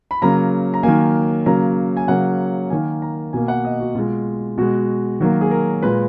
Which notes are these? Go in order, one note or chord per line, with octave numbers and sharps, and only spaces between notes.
B5
C#3 F#3 A#3 A#5
A#5
D#3 F#3 A#3 G#5
C#3 F#3 A#3 A#5
G#5
C#3 F#3 A#3 F#5
D#3 A#3 G#5
A#5
B2 A#3 G#5
F#5
D#5
F#4
B2 G#3 F4
B2 G#3 F#4
D#3 F#3 A#3 F#4
G#4
A#4
A#2 G#3 B4